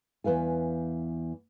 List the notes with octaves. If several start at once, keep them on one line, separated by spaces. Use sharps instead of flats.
E2 B2 B4 F5 G#5